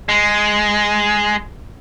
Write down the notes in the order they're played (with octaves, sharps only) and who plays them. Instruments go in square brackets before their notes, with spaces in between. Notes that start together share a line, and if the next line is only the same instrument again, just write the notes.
[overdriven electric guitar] G#3